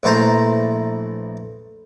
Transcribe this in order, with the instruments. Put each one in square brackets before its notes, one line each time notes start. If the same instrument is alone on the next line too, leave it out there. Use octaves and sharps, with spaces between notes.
[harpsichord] A#1 E3 A3 C5 A#5